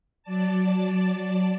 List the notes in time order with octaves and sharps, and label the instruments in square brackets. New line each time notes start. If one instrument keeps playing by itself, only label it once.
[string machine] F#3 D5 A5